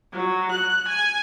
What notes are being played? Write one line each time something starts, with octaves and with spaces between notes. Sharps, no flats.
F#3
F#6
G#5